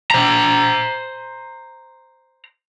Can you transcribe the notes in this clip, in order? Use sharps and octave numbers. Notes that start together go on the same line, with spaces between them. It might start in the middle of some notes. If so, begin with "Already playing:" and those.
C5 A#5